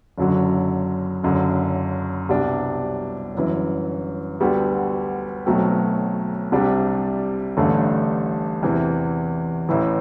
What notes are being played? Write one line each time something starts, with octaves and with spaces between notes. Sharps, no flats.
F#1 F#2 D3 F#3
F#1 F#2 D3
C2 B2 G3 D4
G1 F#2 E3
D2 D3 G3 B3 F#4
B1 B2 F#3 A3 C4
C2 C3 G3 D4
A1 G2 D3 A3
E2 C3 E3
A1 A2 E3